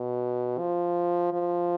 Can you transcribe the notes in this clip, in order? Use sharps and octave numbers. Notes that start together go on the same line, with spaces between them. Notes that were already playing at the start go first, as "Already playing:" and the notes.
Already playing: B2
F3
F3